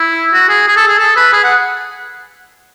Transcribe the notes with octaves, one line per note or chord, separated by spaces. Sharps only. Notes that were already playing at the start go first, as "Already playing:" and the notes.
Already playing: E4
F#4
G#4
G#4
A4
G#4
A4
B4
G#4
F#5